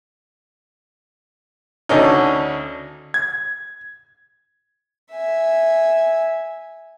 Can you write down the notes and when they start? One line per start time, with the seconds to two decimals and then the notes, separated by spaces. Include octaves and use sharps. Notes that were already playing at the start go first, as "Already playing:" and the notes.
1.89 D2 D3 C#4 D#4
3.14 G#6
5.12 E5 G#5